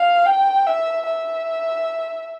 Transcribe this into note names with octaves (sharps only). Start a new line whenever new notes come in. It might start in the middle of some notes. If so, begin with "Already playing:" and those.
Already playing: F5
G5
E5
E5